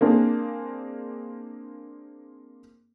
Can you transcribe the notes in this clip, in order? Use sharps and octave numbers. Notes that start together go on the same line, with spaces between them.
A#3 C4 D4 G#4